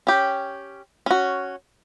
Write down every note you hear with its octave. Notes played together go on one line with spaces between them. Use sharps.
C#4 G4
C#4 F#4